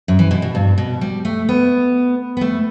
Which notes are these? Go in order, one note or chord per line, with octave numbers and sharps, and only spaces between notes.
F#2
E3
B2
B2
G2
B2
G3
A3
B3
B3
A3